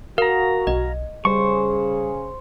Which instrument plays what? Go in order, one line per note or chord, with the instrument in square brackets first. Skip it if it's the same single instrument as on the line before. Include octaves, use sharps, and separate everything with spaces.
[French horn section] F#4 [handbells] A#4 [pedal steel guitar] F5 A#5
[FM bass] B1 [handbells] D#5
[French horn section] C#3 G#4 [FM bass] G3 [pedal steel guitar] C5 C#6